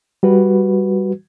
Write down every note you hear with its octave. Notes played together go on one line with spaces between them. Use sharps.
G3 F#4 B4